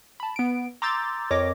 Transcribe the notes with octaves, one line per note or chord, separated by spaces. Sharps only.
A5 B5
B3 D7
A#5 C6 D6 E6 G6 A6
F2 A#4 C#5 D#5 D6 A#6